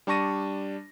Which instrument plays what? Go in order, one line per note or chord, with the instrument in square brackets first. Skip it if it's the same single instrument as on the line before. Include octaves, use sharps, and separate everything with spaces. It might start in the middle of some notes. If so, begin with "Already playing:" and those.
[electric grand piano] G3 D4 A5 C#6 A#6 D#7